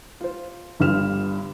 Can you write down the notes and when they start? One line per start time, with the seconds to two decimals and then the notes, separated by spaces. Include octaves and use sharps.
0.21 F4 C5
0.80 G1 G2 G3 F4 F6 E7